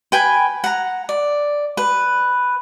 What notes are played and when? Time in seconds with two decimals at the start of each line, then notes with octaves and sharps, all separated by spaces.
0.12 B4 G5 G#5
0.64 F#5 A#5
1.09 D5
1.77 B4